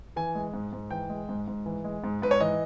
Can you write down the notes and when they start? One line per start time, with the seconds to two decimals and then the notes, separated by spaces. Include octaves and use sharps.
0.16 E3 G#5
0.35 G#3
0.54 G#2
0.73 G#2
0.91 E3 G5
1.09 G#3
1.29 G#2
1.48 G#2
1.66 E3
1.84 G#3
2.04 G#2
2.22 G#2 B4
2.31 C#5
2.40 E3 D#5